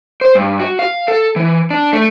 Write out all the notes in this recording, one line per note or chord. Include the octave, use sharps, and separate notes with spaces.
C5
G2
F#4
F5
A4
E3
D4
A3